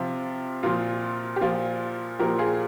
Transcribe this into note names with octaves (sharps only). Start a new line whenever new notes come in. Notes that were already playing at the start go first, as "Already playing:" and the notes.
Already playing: C3 F3 F4
A#2 F3 F4
G4
A#2 F3 F4
A#2 F3 G4 A#4
F4 G#4